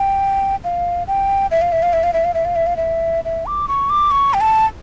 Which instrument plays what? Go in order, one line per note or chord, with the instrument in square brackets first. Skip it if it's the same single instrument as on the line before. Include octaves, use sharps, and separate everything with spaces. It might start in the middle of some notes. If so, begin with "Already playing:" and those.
Already playing: [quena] G5
F5
G5
E5
F5
E5
F5
E5
F5
E5
F5
E5
F5
E5
F5
E5
E5
D6
C#6
D6
C#6
G5
A5